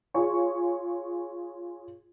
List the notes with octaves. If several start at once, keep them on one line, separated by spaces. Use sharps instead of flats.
F4 G#4 C#5 C#6